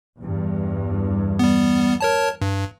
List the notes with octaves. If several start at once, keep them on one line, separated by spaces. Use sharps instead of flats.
E2 G2
G3 B3
A#4 C#5 A5
G2